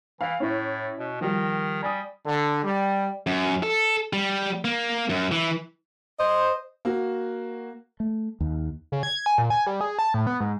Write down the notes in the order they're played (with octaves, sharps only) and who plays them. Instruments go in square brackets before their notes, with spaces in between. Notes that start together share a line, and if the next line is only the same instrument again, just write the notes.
[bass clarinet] E3 [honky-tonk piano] F5
[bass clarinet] A2 [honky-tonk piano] C#4 E4 C#5
[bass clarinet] B2
[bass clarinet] D#3 [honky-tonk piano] F3 G3
[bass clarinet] G3 [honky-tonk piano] G#5 D#6
[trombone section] D3
G3
[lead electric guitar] F#2
A4
G3
A#3
F#2
E3
[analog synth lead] C5 [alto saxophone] D#5
[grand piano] A#3 F#4
[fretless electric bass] A3
D#2
[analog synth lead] C#3
G#6
G#5
A#2
G#5
G3
G#4
A5
A2
B3
G#2